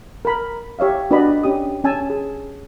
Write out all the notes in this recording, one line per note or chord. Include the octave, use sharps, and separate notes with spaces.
A#4 B5
G4 C#5 E5 F5
D4 F#4 B4 D5 D#5 B5
C#4 G4 D#6
C#4 G#5 A5 E6
G#4